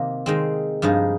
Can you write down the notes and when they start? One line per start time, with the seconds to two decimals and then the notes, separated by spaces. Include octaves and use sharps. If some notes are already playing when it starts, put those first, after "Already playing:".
Already playing: C3 D#3 A#3
0.26 D#3 G#3 C4
0.82 G2 F3 G#3 D#4